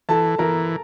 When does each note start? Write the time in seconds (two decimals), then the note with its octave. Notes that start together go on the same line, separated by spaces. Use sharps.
0.09 E3 A4 A5
0.38 E3 A#4 A#5